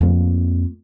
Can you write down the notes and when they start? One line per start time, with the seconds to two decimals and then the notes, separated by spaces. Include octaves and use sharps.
0.01 F2 A#3